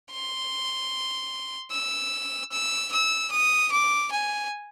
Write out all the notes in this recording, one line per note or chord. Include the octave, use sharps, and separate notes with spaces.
C6
E6
E6
E6
D#6
D6
G#5